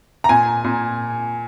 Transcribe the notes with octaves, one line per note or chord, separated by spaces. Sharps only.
A#5
A#2 G#5
A#2